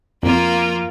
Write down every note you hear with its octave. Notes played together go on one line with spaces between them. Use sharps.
F2 A#3 F4